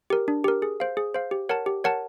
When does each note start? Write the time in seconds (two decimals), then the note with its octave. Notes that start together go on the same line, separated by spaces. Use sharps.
0.10 G4 A#4
0.28 D4
0.44 G4 A#4
0.62 G#4
0.80 C5 F5
0.97 G#4
1.14 C5 F5
1.31 G4
1.49 A#4 C#5 F#5 A5
1.66 G4
1.84 A#4 C#5 F#5 A5